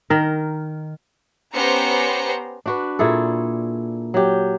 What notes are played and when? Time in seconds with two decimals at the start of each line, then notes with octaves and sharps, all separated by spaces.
0.10 D#3 A#4
1.54 B3 C#4 G4 C5 A#5 C#7
2.66 D4 F#4 B4
2.99 A#2 E4 G#4 A4
4.14 F#3 G4